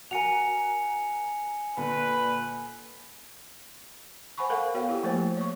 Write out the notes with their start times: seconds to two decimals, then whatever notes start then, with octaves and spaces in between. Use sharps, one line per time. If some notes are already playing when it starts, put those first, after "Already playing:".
0.11 F#4 A#4 G#5 C#7 F7
1.77 A#2 D3 B4
4.38 C5 F#5 G#5 B5 C#6
4.50 A4 A#4 F5 F#5
4.74 B3 F#4 C#5 F5 G5
4.89 E4 G4
5.03 F3 A3 A#3 C5
5.37 C#5 C#6